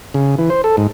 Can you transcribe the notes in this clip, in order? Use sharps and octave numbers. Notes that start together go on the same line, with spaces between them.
C#3
E3
C5
A4
G#2